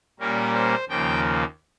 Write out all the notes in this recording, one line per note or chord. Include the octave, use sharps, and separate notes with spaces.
A#2 G3 A#3 C#4 A#4
C5
D#2 C#3 F3 A#3 G5